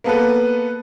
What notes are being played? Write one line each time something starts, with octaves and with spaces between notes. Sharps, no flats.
A#3 B3 A4 B4